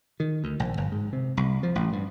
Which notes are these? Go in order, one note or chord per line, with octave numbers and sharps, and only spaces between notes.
D#3
D2
A#1
G1
G#2
C3
C2
F3
A1
G2